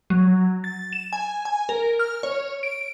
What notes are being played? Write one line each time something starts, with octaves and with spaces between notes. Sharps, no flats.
F#3
A6
E7
G#5
G#5
A#4
F6
C#5
D7